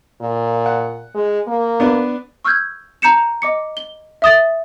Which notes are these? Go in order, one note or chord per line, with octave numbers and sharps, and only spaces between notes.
A#2
F#5
G#3
A#3
B3 D4 B4
C#6 E6 F6 G6 G#6
A5 A#5 G6 C#7 E7
D#5 D6 C#7
G7
E5 D#6 A6